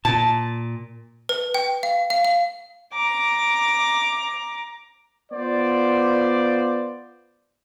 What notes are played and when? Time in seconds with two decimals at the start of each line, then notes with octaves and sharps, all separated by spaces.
0.05 A#2 A5
1.29 B4
1.54 G5
1.83 F5
2.10 F5
2.25 F5
2.94 A#5 D6
5.32 B3 F4 C5 D5